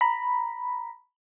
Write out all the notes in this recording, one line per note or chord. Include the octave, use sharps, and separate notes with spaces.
A#5 B5